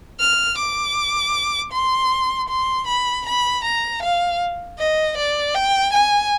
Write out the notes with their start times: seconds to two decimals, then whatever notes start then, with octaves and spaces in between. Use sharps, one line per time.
0.20 F6
0.58 D6
1.73 C6
2.49 C6
2.87 B5
3.26 B5
3.64 A#5
4.03 F5
4.79 D#5
5.17 D5
5.55 G5
5.93 G#5